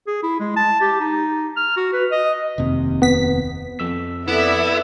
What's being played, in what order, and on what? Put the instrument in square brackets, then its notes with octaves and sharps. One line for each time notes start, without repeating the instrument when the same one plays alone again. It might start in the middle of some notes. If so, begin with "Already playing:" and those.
[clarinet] G#4
E4
G#3
A5
G4
D#4
F6
F#4
B4
D#5
[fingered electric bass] F1 D#2 C3
[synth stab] B3 B6
[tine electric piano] F2 E6 B6
[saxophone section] B3 [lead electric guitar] E4 [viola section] A4 D5 E5